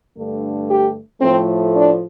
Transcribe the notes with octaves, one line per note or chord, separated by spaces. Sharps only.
G2 D3 A3
G4
A2 F3 A3 C4
D4